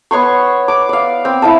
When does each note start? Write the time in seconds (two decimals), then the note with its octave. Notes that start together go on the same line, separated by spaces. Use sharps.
0.11 B3 C#5 C6 C#6
0.68 D6
0.89 D5 F5
1.25 C4
1.42 E4 F5 A5